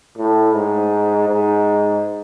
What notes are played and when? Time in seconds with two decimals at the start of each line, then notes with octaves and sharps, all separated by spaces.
0.17 A2
0.54 G#2
1.28 G#2